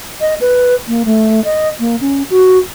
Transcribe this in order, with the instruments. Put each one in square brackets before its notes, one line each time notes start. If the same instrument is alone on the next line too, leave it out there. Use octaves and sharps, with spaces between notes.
[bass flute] D#5
B4
A#3
A3
D#5
A#3
C#4
F#4